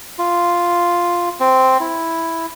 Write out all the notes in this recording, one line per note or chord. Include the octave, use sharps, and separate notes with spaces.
F4
C4
E4